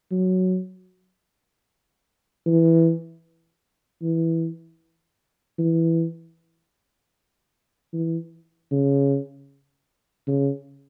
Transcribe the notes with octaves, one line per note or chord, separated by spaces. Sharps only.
F#3
E3
E3
E3
E3
C#3
C#3